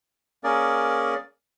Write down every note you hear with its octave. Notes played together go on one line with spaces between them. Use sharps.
A#3 C#4 G#4 A#4 D5